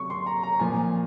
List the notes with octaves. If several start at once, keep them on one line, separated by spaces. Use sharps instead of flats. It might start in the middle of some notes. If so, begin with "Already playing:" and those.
Already playing: C3 F#3 C#6
C6
A#5
A#5
A#2 F3 G#5